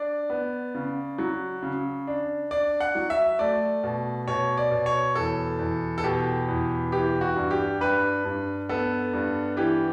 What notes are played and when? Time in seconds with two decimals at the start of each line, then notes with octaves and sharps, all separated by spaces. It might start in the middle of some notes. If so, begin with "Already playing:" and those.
Already playing: D4 D5
0.30 B3
0.75 C#3
1.18 F#3
1.63 C#3
2.07 D4
2.51 D4 D5
2.81 F#5
2.95 F#3
3.10 E5
3.39 A3 D5
3.84 B2
4.28 B2 C#5
4.57 D5
4.71 B2
4.86 C#5
5.15 E2 A4
5.59 E2
5.98 A4
6.04 B2 G4
6.48 E2
6.92 E3 G4
7.21 F#4
7.36 G2
7.51 G4
7.80 G2 B4
8.24 G2
8.69 B3 A4
9.13 G2
9.57 E3 G4